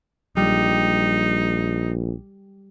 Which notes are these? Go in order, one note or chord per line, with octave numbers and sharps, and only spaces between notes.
A#1 G3 D#4